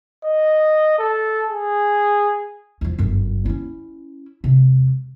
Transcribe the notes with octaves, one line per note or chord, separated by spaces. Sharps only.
D#5
A4
G#4
E2 F3
G1 F#2
C#4 E4
E1 C3